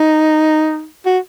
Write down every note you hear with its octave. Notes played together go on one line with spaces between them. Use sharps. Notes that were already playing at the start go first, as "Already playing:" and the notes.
Already playing: D#4
F#4